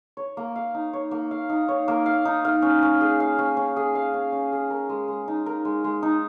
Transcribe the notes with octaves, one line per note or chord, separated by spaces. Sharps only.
C#5
A#3
F5
D#4
C#5
A#3
F5
D#4
C#5
A#3
F5
D#4
F5
C#4
C#4
G#4
F5
C#4
C#4
G#4
F5
C#4
C#4
G#4
A#4
G#3
G#3
D#4
A#4
G#3
G#3
D#4